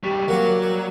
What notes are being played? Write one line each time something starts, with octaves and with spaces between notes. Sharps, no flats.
F2 G3 G4 C#6 B6
F#3 A#3 F#4 A#4 D5
G3